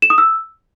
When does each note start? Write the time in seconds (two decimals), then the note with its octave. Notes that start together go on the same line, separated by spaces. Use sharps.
0.02 E7
0.10 D#6
0.18 E6